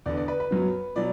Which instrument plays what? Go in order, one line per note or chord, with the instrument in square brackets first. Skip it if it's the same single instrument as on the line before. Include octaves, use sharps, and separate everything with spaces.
[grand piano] E2 D3 B3 D5
D5
B4
B4
F#2 F#3 B3
B2 F#3 D5